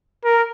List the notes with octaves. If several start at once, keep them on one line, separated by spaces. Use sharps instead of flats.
A#4